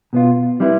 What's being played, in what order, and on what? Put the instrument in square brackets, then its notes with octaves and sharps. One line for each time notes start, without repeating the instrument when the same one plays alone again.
[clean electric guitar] B2 B3 F4
G3 C4 E4 B4